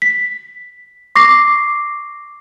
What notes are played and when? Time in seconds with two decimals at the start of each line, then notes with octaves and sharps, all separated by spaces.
0.02 B6
1.15 C#6 D6 A#6 C7